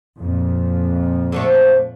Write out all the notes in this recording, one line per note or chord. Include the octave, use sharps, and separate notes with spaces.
F2 A#2
D3 F3 A3